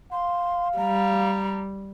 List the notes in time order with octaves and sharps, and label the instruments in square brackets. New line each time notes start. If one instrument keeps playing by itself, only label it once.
[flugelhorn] F5 [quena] C6
[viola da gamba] G3 [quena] A#5